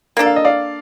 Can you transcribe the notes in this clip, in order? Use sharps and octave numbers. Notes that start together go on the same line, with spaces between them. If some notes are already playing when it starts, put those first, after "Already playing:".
A#3 D4 A4
F5
D#5
D5 F5